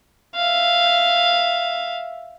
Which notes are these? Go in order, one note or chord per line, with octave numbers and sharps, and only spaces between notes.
E5 F5